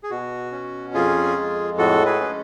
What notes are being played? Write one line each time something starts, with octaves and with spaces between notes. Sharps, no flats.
G#4
B2 F#4
C#4
F2 F4 G#4
G#3
A2 F#4 A4
G#4 B4
C#4